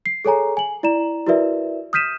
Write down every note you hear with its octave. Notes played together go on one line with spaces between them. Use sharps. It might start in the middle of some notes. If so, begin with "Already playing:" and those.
C7
G#4 A4 C#5 G#5 A#5
G#5 F#7
E4 D5 A#5 E7
E4 F#4 A#4 B4 D5 E5
D#6 F6 G6 B6 D#7 E7